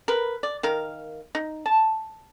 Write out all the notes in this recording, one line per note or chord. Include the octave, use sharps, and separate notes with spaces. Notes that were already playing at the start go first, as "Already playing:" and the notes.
A#4 B4
D5
D#3 A#4 F5
D#4
A5